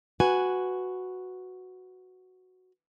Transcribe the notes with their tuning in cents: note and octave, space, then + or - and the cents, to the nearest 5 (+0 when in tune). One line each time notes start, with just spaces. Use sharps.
F#4 +0 B4 +5 G#5 +0